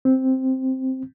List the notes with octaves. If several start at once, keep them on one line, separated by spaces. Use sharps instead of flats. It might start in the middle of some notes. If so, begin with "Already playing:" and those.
C4